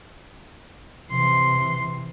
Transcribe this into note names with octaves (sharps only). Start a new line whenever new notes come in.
C3 E3 C6